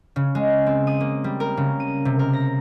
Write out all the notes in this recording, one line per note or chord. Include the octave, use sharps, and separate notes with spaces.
C#3
G#3
C4
D#6
A#3
G3
A#4
C#3
D#7
C3
A#4
A#6